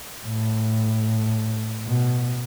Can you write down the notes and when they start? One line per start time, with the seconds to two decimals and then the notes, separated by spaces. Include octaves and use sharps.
0.25 A2
1.86 B2